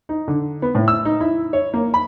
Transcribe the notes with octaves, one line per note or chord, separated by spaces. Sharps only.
D#4
D3
B3
A2
E6
D#4
E4
C#5
A#3
B5